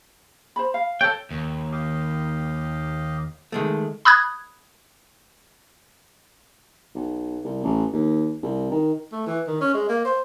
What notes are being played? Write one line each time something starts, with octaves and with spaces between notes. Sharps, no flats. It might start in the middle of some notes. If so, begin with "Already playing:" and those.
C5 B5
F5
A4 C#5 G5
D#2
G4 D#5 F5
D#3 G#3 A3
B5 D#6 F#6 G#6
B1
C2
A1
D#2
C2
D#3
A3
E3
D#3
C#4
G#3
A#3
C5